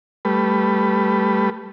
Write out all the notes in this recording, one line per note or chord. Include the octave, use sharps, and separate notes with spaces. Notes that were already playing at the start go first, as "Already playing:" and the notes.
G3 A3 B4